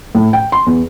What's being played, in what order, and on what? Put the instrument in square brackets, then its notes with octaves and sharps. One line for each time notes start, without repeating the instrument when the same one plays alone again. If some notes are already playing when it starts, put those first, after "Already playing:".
[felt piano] A2
G5
C6
E2